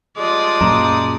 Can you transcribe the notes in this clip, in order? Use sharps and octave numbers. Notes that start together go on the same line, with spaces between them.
F3 G3 G#3 D5 D#6
F#2 A#2 A#5